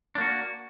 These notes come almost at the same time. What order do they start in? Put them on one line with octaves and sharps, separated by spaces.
D4 A#3 F#4